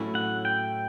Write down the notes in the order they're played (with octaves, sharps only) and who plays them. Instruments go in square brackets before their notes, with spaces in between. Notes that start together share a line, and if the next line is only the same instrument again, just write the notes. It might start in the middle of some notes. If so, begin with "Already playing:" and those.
Already playing: [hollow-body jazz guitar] A2 F#3 A3 C#4 E4
[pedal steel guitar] F#5
G5